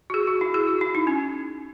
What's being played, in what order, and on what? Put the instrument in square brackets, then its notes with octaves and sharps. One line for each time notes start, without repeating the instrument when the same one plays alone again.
[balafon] F#4
G#4
F#4
E4
G#4
F#4
E4
D#4
C#4